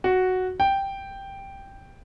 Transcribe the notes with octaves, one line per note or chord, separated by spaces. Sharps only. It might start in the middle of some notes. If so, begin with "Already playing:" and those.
F#4
G5